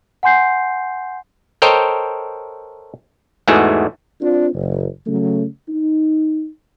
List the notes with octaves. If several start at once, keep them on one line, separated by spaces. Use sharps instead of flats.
F#5 G#5 C6 G6 C7
A4 A#4 C5 C#5 D#5 G5
E2 G#2 E3 G#3 A3 F#4
C4 D4 F4
F#1
C#3 F#3 A3 C#4
D#4